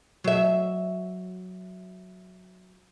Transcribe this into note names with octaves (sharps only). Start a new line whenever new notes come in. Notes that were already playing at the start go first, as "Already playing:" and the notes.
F#3 E5